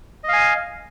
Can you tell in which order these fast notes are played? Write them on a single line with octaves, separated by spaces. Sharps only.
D#5 F5 G#5